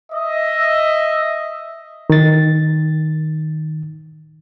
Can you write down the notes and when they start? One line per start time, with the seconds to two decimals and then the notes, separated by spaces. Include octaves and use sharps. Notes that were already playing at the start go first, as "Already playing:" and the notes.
0.13 D#5 E5
2.10 D#3 A6